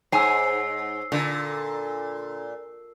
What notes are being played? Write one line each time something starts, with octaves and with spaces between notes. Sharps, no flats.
G#2 C#5 G#5 E6 C7
A#2 D3